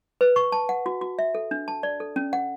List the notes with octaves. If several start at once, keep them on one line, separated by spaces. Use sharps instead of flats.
B4
C#6
A5
F#5
F#4
F#4
E5
A4
D4
A5
D5
A4
C#4
F#5